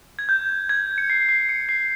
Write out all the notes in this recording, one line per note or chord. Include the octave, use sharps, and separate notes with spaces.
G#6
G6
G#6
C#7
C7
C7
C#7
C7